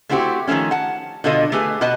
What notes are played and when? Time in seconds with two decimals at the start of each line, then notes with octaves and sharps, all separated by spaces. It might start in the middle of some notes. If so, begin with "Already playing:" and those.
0.09 A3 C4 E4 F#4 G4 C5
0.48 D#3 F3 G#3 A3 C#4
0.71 F#5 A5
1.24 B2 D3 F4 A4 D#5
1.52 A3 G4 G#4 B4
1.81 B2 B3 B4 D#5 A5